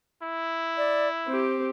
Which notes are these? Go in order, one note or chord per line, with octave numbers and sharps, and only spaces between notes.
E4
D5
C4 G4 C5